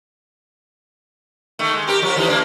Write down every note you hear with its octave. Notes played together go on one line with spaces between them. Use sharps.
D#3 A3
G#3
G4 A#4
F3 A#4
D#3 E3 D#4
A3 A#3 D4